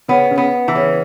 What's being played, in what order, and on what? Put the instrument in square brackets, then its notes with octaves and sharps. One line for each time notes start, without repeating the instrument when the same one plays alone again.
[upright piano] C#3 C#4 [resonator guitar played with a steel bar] B3
[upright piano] C#3 C#4
[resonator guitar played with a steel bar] B3
E3
[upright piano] C#3 C#4